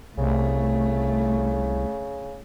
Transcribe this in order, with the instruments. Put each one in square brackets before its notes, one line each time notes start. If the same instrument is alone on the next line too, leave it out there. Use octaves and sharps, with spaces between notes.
[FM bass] C2 [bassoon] C#3 [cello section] A3